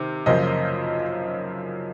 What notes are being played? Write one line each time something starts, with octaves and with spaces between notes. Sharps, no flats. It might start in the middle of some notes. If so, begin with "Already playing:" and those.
Already playing: C3 D#3
F#2 C#3 F3 A#3 C5 D#5